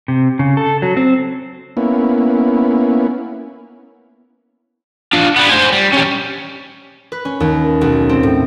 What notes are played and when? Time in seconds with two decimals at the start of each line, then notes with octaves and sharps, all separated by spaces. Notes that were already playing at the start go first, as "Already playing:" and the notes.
0.08 C3
0.39 C#3
0.57 A4
0.82 F#3
0.97 C4
1.77 A#3 B3 C#4 E4
5.13 D4 F4
5.36 G3 B3
5.49 C5 G#5
5.72 G3
5.92 C#4 G4
7.12 B4
7.25 C#4
7.40 D#2
7.81 B1
8.09 C4
8.23 A2